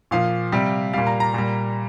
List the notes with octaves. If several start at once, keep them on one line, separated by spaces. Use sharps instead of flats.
A#2 F3 F5
C3 G3
A#2 G3 F5
A#5
A#5
A#2 G3